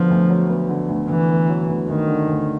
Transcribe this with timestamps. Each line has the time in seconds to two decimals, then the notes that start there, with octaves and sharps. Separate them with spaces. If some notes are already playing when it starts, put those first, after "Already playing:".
Already playing: D3 F3 F#3 B3
0.10 D2
0.30 F#3
0.49 B3
0.69 D3
0.89 D2
1.09 D2 E3
1.29 B3
1.49 F#3
1.68 D2
1.88 D2 D#3
2.08 D3
2.27 D2